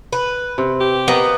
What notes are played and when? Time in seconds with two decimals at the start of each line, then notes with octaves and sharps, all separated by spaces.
0.13 B4
0.58 C3
0.80 G4
1.08 A#3 B3 D#5